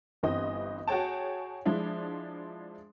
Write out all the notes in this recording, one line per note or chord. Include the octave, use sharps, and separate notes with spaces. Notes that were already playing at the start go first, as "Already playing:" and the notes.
G1 G2 E3 C4 D#5
F#4 G#4 C#5 G5 A5
F3 G#3 D4 E4